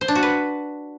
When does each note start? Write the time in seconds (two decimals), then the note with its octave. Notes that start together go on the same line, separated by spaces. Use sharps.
0.01 C5
0.08 D4
0.15 F#4
0.23 B4